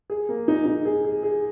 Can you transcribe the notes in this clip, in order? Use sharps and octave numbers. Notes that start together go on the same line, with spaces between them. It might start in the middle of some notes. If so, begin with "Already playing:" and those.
G#4
A#3
D#4
D#4
G#4
G#4
G#4